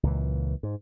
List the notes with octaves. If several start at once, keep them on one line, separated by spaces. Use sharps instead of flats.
C#2 A#2 E3
G#2